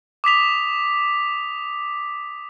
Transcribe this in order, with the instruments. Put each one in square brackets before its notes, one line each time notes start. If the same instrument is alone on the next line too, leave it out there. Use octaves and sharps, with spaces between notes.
[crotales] D6 D#6 B6 F7